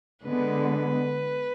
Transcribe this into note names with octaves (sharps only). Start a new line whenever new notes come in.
D3 G#3 B3 B4